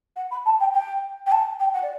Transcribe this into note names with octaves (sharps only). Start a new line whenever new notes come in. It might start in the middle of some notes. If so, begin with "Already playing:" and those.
F#5
B5
A5
G5
G5
G5
A5
G5
F#5
D5